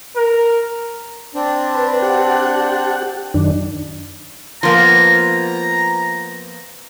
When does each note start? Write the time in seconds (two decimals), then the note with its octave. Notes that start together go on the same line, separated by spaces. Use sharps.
0.16 A#4
1.35 C4 D4
1.75 B4
2.02 G4 F#5
3.34 F#2 D#3 D4
4.63 F3 A#3 B3 A#5